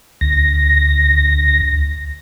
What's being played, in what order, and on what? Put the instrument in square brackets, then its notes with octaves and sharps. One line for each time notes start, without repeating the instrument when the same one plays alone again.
[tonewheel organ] D2 A#6